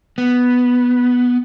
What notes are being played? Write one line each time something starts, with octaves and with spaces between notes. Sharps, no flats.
B3